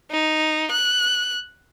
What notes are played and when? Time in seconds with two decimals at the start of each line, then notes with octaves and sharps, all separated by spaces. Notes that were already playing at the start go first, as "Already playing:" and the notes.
0.11 D#4
0.72 F#6